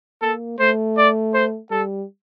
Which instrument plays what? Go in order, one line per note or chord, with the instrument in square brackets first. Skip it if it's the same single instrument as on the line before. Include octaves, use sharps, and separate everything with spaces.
[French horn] A#3 [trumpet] A4
[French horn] A3 [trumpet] C5
[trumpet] D5
C5
[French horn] G3 [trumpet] A4